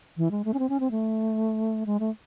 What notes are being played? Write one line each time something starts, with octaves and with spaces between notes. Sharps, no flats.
E3
G#3
A3
C#4
C4
C#4
C4
A3
G#3
A3